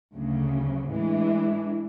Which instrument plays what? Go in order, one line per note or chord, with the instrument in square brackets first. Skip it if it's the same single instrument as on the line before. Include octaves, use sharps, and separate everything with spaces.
[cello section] D2 C#3 F#3
A2 E3 G#3 D4